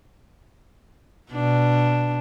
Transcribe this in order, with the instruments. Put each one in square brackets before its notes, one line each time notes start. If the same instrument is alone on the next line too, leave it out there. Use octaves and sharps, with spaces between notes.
[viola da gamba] B2 D4